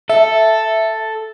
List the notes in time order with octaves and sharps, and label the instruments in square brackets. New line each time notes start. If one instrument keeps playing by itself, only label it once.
[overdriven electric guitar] A4 [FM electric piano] E5